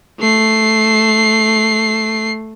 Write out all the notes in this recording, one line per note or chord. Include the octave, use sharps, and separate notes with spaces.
A3 C7